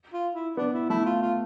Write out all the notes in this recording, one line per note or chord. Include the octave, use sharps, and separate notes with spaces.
F4
E4
B3 D4
E4
A3 E4
F4
F4